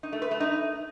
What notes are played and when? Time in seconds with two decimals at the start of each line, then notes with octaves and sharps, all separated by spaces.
0.03 D#4
0.12 A3
0.22 B4
0.31 A3
0.40 D#4